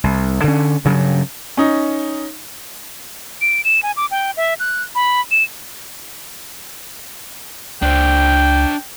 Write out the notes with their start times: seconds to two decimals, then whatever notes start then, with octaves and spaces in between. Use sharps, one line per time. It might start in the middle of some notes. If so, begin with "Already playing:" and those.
0.04 C2
0.44 D3 C#4
0.85 G2 C#3 F#3
1.57 C#4 D#4
3.41 D7
3.65 E7
3.83 G#5
3.97 D6
4.11 G5
4.37 E5
4.60 F#6
4.95 B5
5.31 E7
7.82 C#2 D4 C5 G5